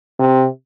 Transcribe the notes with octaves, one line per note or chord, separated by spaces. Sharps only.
C3